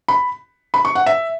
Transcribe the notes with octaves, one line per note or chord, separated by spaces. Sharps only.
B5
B5
C#6
F#5
E5